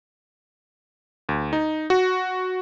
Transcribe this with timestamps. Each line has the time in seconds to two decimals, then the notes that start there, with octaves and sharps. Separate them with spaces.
1.29 D2
1.53 D#4
1.90 F#4